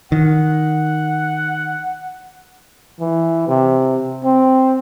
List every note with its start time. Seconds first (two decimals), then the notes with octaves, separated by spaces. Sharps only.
0.12 D#3 F#5
3.00 E3
3.48 C3
4.24 C4